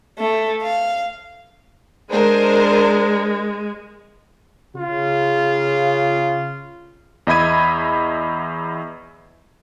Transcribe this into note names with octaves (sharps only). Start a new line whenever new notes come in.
A3
F5
G#3 D4 A#4 C5
C#3 F4
E2 D#5 E5 B5 G#6 D#7